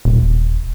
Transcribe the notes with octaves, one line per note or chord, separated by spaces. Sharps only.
D#1